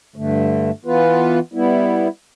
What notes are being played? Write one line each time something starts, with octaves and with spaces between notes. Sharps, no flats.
G2 D3 A3
E3 B3 F4 B4
G3 B3 E4